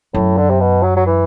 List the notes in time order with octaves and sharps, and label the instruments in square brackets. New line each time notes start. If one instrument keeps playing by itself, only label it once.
[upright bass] F#2 [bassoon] A2
[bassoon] D3
C3
B2
F#3
F#3
E3